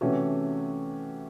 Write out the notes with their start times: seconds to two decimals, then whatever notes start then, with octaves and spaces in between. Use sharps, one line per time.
0.01 C3 E3 A3 C#4 F#4